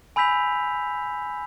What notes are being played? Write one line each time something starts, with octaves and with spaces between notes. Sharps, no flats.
G#5 B5 E6 G6 B6 F7